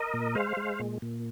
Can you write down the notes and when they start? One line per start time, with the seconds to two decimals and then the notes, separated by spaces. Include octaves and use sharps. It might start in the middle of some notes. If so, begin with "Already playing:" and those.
Already playing: A#4 D#5
0.13 A#2
0.35 G#3 C5 F5
0.57 G#3
0.79 A#2
1.02 A#2